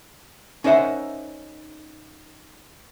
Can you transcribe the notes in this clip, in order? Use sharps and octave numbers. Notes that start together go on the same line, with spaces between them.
C#4 D#4 A#4 C5 E5 F#5